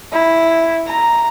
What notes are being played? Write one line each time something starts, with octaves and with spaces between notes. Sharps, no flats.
E4
A#5